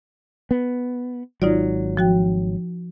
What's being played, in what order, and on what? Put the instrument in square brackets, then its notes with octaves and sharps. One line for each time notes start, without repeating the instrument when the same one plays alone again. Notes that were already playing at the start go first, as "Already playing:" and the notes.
[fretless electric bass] B3
[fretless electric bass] G#1 F#3 [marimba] D#4 F4 D5
[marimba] F3 F#4 G5